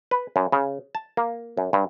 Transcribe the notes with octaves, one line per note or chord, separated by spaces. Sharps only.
B4
F#2
C#3
A5
A#3
F#2
G2